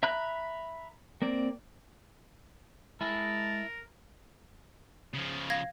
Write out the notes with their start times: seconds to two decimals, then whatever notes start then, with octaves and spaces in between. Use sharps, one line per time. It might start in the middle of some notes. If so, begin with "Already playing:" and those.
0.03 E5 A#5 B5 F#6
1.22 A#3 C4 D5
3.01 G#3 E4 A#4 G#5 A5
5.14 C#3 F3
5.50 F5 G#6 A#6